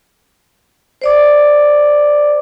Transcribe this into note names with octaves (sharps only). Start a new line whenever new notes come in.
C5 D5 D6